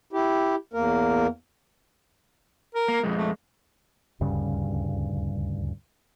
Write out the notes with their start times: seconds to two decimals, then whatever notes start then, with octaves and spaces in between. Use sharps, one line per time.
0.13 E4 G4
0.74 E2 A#3 A#4
2.75 A#4
2.88 A#3
3.04 F2 G#3
3.15 A3
4.21 D#1 D2 G2 C#3